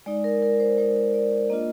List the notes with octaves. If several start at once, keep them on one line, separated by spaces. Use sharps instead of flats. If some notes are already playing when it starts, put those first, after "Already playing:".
G#3 D#4 D5
A#4
A#4
C5
G#3 D#4 C5
D5
A#3 D4 F4 D#5